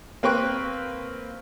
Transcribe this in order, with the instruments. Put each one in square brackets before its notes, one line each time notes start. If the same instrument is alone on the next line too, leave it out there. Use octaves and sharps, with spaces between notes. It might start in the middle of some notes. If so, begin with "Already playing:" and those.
[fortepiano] A#3 C4 B4 G5 C#6 F#6